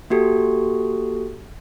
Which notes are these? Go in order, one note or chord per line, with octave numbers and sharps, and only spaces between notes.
A#3 F#4 G4 A4